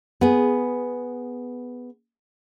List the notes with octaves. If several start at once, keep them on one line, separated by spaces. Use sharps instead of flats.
B3 G#4